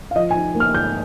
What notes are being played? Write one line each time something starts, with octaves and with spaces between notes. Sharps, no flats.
F5
F3 D#5
G#5
D#4
A#3
F6
G#2 G6